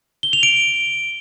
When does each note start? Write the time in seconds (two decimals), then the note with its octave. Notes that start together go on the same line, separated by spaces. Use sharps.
0.23 G7
0.33 F7
0.43 D7